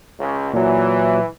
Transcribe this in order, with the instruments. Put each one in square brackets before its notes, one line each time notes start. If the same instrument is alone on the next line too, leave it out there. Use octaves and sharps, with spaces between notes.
[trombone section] C#2
[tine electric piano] A#2 F#3 [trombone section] E3